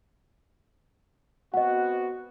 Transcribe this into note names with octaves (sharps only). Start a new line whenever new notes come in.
B3 C4 F#4 D#5 F#5